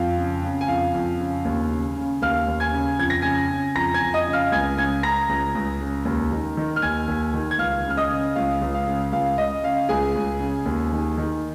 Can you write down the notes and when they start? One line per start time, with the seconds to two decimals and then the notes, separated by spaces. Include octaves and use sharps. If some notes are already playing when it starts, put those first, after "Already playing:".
Already playing: F2 F5
0.17 C#3
0.43 C#3
0.61 G#5
0.68 F2 F5
0.94 F2
1.20 C#3
1.45 D#2
1.71 C#3
1.96 C#3
2.22 D#2 F5 F6
2.48 D#2
2.60 G#5 G#6
2.73 C#3
2.99 F2 G#6
3.10 A#6
3.22 C#3 G#5 G#6
3.50 C#3
3.75 F2 A#5 A#6
3.94 G#5 G#6
4.01 F2
4.14 D#5 D#6
4.27 C#3
4.33 F5 F6
4.52 C#2 G#5 G#6
4.78 C#3 G#5 G#6
5.03 C#3 A#5 A#6
5.29 C#2
5.55 C#2
5.81 C#3
6.05 D#2
6.32 D#3
6.57 D#3
6.76 F6
6.82 D#2 G#5 G#6
7.08 D#2
7.34 D#3
7.51 G#6
7.59 C#2 F5 F6
7.85 C#3
7.90 F6
7.97 D#5 D#6
8.10 C#3
8.36 C#2 F5
8.61 C#2
8.74 F5
8.87 C#3
9.13 C#2 F5
9.38 C#3 D#5
9.63 C#3 F5
9.89 C#2 G#4 G#5
10.15 C#2
10.40 C#3
10.66 D#2
10.92 D#3
11.18 D#3